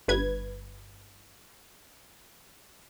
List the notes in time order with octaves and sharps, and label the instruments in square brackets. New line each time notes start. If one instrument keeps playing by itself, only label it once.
[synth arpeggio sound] G1 G2 B4 G#6